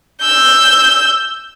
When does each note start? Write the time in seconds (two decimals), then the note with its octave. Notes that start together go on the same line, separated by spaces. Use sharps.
0.21 E6 G6